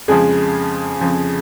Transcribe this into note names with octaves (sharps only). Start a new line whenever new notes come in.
F2 C#3 F3 G#3 G#4
F2 C#3 F3